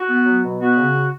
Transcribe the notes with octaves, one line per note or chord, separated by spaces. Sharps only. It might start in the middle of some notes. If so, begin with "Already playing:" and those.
Already playing: F#4
B3
F#3
B2
B3 F#4
C#3